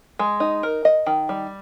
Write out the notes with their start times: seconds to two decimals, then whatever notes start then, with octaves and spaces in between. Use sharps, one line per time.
0.19 G#3
0.40 D#4
0.63 A#4
0.85 D#5
1.06 D#3
1.29 G3